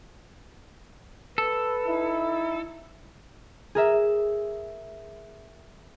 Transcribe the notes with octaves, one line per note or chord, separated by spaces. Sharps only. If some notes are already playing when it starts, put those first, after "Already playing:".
A4 B4
D#4 E4
G#4 A#4 E5